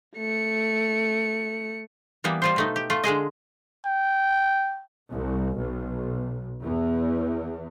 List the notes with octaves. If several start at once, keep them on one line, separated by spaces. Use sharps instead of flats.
A3 C#7
E3 G3 A#3 B3
G3 F4 C5
B2 A3 D#4
G4
A3 F4
D3 G#3 G#4 D#5
G5
C2
B1
E2